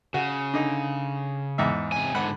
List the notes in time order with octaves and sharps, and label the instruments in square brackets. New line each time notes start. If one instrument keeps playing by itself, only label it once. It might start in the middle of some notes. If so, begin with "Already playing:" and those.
[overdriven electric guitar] C#3 [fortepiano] F#4
[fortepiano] D3 D#4
E2 G#2 E5
[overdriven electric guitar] C3 G#5
[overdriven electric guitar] G#2 D3 [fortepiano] F#5 B5